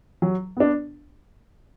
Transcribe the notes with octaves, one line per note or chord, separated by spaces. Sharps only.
F#3
B3 D4